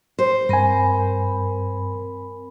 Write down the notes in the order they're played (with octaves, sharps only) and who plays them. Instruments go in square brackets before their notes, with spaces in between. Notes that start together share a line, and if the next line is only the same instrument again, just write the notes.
[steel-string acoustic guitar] C5
[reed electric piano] G2 G#5 [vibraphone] C4 A#4 B5